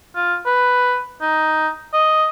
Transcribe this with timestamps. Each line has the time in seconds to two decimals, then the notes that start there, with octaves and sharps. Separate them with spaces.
0.15 F4
0.46 B4
1.22 D#4
1.94 D#5